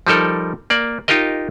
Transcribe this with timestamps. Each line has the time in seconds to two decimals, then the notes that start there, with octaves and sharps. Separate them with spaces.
0.07 F3 G3 D#4 A4 A#4
0.70 A#3 D5
1.08 D#4 F4 G4 A#4 D#5